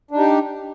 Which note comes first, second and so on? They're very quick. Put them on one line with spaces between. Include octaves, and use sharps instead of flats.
D4 D#4 G4